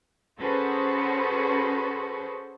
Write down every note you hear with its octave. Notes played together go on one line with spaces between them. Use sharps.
C#4 F#4 G#4 A4 B4 C5